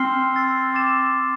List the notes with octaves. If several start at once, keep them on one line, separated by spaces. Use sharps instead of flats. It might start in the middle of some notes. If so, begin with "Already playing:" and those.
Already playing: C4 C6 F6 C7 G7
C6 E6 A6 C7
D6 A6 E7